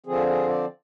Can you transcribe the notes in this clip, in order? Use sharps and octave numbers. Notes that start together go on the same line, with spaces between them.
D3 F3 C4 G#4
G#4
D5